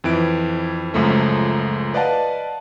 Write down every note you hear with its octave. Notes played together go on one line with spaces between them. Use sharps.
F2 E3 D7
C#2 F#2 F3 A3 C#4
B4 D5 D#5 F5 F#5 A5